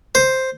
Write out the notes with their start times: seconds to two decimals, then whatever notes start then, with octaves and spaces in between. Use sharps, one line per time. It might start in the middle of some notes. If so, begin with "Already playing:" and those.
0.15 C5